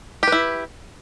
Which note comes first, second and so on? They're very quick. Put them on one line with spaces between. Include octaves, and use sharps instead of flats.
G4 B4 E4